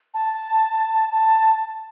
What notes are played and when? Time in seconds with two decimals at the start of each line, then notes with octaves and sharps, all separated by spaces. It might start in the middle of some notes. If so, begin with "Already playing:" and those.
0.14 A5
1.12 A5